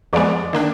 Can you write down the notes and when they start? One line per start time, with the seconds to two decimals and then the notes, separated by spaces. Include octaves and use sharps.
0.13 F2 F3 G#3 B3 D5
0.53 D#3 A#3 D4